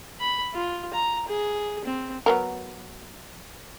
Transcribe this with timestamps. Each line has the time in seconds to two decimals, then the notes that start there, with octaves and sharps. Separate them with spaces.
0.20 B5
0.54 F4
0.94 A#5
1.28 G#4
1.85 C4
2.26 F#3 B3 A#4